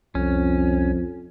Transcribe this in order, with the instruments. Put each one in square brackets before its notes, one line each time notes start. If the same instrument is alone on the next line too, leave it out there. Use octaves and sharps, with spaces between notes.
[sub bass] C2 [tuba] F2 [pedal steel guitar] C#4